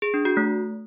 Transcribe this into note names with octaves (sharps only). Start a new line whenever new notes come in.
G#4
D4
F#4
A3